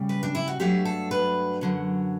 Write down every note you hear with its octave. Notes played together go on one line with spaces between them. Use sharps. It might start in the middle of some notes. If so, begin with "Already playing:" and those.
Already playing: C#3 G3
B4
D4
E4
F#4
G2 F#3 A3 D4 G4
A4
B4
F#2 D3 F#3